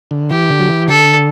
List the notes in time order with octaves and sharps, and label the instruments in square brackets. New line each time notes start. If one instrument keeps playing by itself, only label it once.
[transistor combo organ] D3
[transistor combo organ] E3 [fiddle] G4
[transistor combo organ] D3
F#3
E3
[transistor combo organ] D3 [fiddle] A4